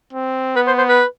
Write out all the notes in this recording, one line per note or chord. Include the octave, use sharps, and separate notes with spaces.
C4
B3 B4
C5
C5
B4